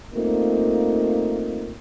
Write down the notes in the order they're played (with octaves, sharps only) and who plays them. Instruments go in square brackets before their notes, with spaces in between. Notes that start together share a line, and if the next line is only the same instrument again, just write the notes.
[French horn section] A3 A#3 C4 D#4 F4